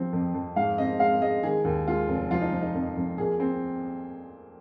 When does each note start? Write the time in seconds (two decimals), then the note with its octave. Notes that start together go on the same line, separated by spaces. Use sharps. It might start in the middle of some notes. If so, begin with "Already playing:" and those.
Already playing: F3 C4
0.13 F2
0.34 F2
0.56 G#2 F5
0.78 C4 D#5
0.99 G#3 F5
1.22 G#3 D#5
1.43 D#3 G#4
1.65 D#2
1.87 G#3 F4
2.08 F1
2.31 F3 F4
2.41 D#4
2.53 F3
2.62 D#4
2.74 F2
2.97 F2
3.18 A#2 G#4
3.40 C4